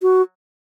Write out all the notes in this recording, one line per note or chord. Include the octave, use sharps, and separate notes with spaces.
F#4